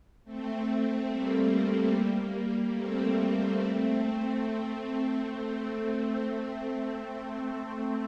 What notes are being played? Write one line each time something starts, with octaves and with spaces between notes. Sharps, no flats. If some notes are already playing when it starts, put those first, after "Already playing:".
A3 C4
G3 A#3
A3 C4
A3 C4
A3 C4